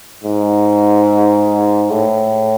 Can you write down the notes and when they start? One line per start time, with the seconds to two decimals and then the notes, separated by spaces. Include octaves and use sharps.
0.24 G#2
1.91 A2